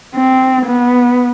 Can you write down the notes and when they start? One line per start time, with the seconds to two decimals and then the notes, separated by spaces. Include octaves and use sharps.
0.15 C4
0.66 B3